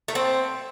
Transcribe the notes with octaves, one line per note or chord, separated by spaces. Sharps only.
A3
C4